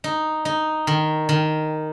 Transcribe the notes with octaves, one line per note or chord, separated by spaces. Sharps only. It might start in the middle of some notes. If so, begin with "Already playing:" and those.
D#4
D#4
D#3
D#3